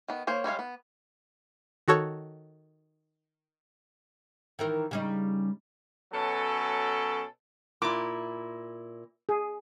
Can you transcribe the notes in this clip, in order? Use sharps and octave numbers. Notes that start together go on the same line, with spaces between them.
D#3 B3
A#3 C5 C#5
G3 G#3 C#5 F5
B3
D#3 F#4 A4 C#5
D#3 E3 A#4
C#3 G3 D#4
B2 F#3 C#4 A4
A#2 E4 D6
G#4